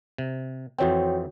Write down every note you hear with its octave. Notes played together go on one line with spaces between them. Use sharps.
C3
F2 E3 C4 F#4 C#5 G5